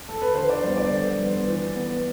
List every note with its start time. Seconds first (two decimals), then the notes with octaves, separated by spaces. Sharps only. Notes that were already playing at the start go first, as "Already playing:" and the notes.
0.09 A4
0.22 B4
0.34 D3 C5
0.50 D5
0.63 G3 B3 C5
0.77 D5
0.90 D3
1.19 G3 B3
1.47 E3
1.76 B3